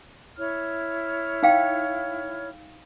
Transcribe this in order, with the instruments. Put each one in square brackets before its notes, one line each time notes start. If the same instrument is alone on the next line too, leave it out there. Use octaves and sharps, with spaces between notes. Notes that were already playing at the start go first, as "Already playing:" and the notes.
[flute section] E4 C#5 F6
[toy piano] D#4 F5 G5